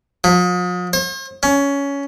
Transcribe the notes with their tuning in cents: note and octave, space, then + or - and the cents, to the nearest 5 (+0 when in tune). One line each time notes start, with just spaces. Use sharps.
F3 +45
C5 +45
C#4 +15